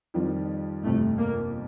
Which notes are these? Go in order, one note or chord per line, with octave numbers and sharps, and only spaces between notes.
F2 D#3 G3 C4 F4
G1 F2 C3 A3
A#3